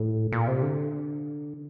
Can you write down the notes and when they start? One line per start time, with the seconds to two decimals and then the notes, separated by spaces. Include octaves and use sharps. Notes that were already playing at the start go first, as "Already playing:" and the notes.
Already playing: A2
0.32 A#2
0.48 C3
0.62 D3